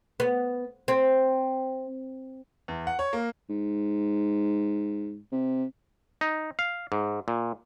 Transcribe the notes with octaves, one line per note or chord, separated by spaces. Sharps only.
B3
C4
E2
F#5
C#5
A#3
G#2
C3
D#4
F5
G#2
A#2